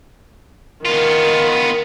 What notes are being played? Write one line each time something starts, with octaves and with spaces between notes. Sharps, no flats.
D#3 B3 F4